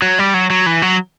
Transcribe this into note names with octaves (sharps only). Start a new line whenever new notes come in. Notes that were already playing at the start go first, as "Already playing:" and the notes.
F#3
G3
F#3
F#3
E3
F#3